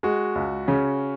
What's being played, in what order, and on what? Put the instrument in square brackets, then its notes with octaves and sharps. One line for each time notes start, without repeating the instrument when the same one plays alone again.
[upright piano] G#3 [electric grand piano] F#4
[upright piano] C#2
[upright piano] C#3 [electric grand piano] C#4